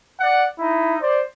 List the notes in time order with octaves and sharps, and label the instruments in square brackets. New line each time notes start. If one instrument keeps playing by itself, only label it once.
[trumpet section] D5 F#5
D#4 E4
C5 D5